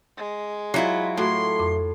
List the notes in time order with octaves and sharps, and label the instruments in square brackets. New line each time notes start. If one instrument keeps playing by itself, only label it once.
[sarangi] G#3
[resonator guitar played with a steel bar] F#3 E4 F4
[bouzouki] A2 [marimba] A3 F#4 [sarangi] C6
[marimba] F2 D6